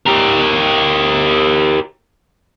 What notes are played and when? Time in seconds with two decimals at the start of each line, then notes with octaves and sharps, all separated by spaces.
0.07 G4 A#4